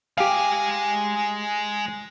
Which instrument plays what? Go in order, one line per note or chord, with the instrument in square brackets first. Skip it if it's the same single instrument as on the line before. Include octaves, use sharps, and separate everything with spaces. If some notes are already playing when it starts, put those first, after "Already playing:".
[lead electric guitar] G#3 G#5 [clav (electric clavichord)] G4 F5